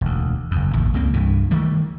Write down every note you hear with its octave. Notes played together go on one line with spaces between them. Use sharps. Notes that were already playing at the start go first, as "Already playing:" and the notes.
E1 D2
F#1 E2
A1 D#2
C#2 C#3 A#3 C4
C2 G2 E3
D#3 E3 G3 A3